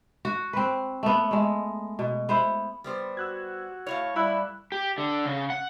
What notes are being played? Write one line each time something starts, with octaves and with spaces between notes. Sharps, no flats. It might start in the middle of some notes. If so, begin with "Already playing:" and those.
F#4
C4 B4
A3 B3
G#3 A3
B2
B3 E4 C5
G3 B3 C5
F#4 E6 F#6 G#6
A2 A3 C#5 F5
G3 E4 B5 E6 F#6
G4
D3
C#3
F#5